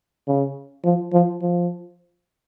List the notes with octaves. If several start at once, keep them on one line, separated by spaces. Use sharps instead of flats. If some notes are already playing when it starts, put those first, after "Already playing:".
C#3
F3
F3
F3